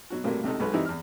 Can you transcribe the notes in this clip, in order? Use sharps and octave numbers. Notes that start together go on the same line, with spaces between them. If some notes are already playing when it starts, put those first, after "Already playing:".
B2 F#3 F#4
A2 C3 F#3 G3 A#3
C#2 C3 D#4 A4
B1 G#3 B4
E3 G3 C4 D#4 E4
E2 F6